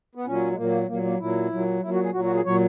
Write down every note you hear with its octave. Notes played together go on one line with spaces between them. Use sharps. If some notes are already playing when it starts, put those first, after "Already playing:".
B3
A#2 F#3 C#4
G#3
A#2 F#3 A#3
A#2 F#3 A#3
A#3
A#2 F#3 E4
A#2 F#3
A#2 F#3 E4
F#4
G#4
A#2 F#3 F#4
F#4
G#4
A#2 F#3 C#5